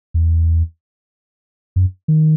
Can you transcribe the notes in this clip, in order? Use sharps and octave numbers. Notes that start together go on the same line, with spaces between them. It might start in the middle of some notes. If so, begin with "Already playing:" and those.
E2
F#2
D#3